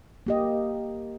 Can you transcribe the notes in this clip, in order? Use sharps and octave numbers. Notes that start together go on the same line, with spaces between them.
A#3 G4 D#5